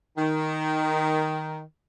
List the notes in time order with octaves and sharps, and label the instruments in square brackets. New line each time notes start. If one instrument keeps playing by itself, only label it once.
[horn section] D#3